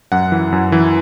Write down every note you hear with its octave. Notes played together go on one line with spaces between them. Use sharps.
F#2 F#5
E3
F#2
E3